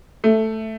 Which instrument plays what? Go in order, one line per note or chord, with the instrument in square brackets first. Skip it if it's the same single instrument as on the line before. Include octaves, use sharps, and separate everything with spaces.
[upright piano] A3